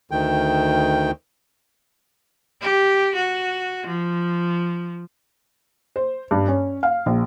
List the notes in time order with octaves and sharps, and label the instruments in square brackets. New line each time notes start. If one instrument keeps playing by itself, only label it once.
[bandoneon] D2 D#3 G5
[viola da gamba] G4
F#4
F3
[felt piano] C5
G2
C#4
F5
A#1